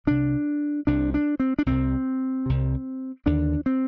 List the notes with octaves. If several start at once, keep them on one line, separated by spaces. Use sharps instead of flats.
C2 C3 D4
C2 C3 D4
D4
C4
D4
C2 C3 C4
C2 C3
D#2 D3 D4
C4